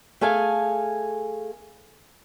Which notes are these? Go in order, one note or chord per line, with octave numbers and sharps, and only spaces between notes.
A3 G#4 A4 F5 G#5